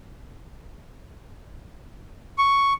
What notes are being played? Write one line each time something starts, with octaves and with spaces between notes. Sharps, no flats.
C#6